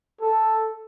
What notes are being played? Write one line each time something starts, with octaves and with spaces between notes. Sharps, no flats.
A4